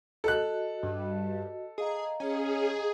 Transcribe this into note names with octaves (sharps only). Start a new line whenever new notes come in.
F#4 A4 D#5 F#6
G2
G#4 D#5 F5 A#5
C#4 G#4